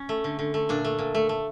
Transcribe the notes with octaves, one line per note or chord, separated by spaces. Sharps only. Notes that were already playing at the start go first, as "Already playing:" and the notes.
Already playing: C#4
A3
D3
D3
A3
A#2 D4
A3
A#2
A3
A3